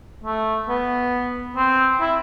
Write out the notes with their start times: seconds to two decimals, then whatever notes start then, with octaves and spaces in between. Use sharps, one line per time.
0.24 A3
0.69 B3
1.57 C4
2.01 E4